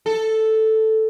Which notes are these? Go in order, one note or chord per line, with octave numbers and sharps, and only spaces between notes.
A4